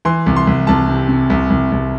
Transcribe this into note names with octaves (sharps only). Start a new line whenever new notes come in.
E3 C6
C2
C6
C2
C2 A5
C3
C3
C2
C2
C2